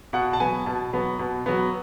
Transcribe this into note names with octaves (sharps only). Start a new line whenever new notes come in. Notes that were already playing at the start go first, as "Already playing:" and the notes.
B2 F#5
A5
F#3 B3 G#5
B2 A5
F#3 B3
B2
F#3 B3